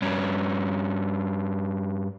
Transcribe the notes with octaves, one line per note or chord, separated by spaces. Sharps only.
G2 C#4